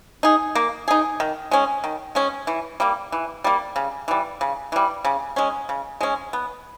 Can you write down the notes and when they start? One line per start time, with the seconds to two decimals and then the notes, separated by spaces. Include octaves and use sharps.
0.23 D#4 G#4
0.55 A#3
0.88 D#4 G#4
1.20 D#3
1.51 G#3 C#4
1.84 D#3
2.15 G#3 C#4
2.47 E3
2.80 G3 A#3
3.12 E3
3.44 G3 A#3
3.76 C#3
4.08 E3 G3
4.41 C#3
4.72 E3 G3
5.05 C#3
5.36 G#3 C#4
5.69 C#3
6.01 G#3 C#4
6.33 B3